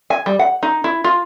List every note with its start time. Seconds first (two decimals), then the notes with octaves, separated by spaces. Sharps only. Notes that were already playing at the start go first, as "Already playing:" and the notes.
0.10 G#5
0.26 G3
0.39 F#5
0.63 D#4
0.84 E4
1.04 F4